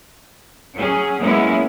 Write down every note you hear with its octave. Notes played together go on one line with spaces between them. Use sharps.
F#3 C#4 G#4
F#3 G#3 A#3 B3 C#4 E4